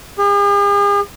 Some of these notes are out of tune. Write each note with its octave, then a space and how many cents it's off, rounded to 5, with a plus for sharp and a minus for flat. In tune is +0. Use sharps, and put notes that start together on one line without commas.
G#4 -45